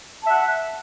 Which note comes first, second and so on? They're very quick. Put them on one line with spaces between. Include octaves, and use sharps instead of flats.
A5 E5 F#5